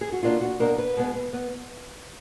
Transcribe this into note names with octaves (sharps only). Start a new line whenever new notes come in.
G#4
F#4
B2 A#3 D4 F4
F#4
B2 A#3 D4 A#4
B4
B2 G#3 B3
B3